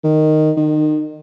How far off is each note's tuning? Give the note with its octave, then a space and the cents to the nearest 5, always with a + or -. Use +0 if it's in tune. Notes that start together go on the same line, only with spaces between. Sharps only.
D#3 -5
D#3 -30